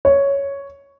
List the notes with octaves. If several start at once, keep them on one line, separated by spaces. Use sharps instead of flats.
C#5